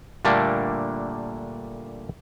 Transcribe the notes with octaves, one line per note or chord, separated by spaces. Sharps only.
A#2 D3 G3 A3 A#3 D4